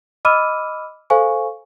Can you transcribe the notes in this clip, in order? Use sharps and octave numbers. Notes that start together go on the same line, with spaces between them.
D#5 B5 D6 E6 F6 D#7
A4 C5 F5 G#5 C#6